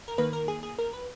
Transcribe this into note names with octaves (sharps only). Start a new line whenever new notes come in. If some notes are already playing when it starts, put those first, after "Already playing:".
A#4
D#3 A#3 B4
A#4
G#4
G#4
A#4
B4